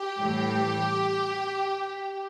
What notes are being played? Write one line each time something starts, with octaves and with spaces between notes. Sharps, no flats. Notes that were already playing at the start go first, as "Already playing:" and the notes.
Already playing: G4
A2 E3 G3